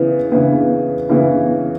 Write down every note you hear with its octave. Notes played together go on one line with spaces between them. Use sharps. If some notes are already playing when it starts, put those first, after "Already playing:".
Already playing: C#3 E3 B3 E4
C#3 E3 B3 E4
C#3 E3 B3 E4